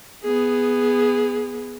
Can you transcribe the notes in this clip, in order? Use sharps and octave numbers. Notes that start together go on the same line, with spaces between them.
B3 G#4